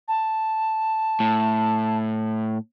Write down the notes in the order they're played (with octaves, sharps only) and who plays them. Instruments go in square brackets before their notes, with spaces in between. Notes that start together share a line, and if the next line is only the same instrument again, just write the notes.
[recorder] A5
[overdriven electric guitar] A2